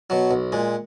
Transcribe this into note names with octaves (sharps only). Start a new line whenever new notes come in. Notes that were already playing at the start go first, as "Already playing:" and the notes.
B2 F#3
B1
A#2 G#3